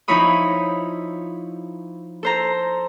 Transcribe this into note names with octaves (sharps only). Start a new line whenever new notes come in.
F3 D#4 E4 C#5 B5 D#6
A4 C5 A#5